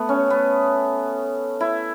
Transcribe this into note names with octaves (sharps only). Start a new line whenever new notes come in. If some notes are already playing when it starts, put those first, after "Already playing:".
Already playing: A3 B3
C#4
B3
E4